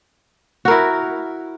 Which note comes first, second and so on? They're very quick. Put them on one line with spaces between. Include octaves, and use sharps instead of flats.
F#4 A#4 E4